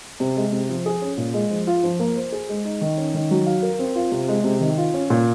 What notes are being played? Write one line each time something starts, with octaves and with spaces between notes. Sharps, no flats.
C3
G#3
C3
F3
G#4
C#4
A#2
G#3
F3
F4
F3
A#3
C5
G#4
G#3
D#4
D#3
C#4
D#3
F#3
F5
A#4
C4
F4
C3
G#3
C3
D#3
F4
C#4
A#2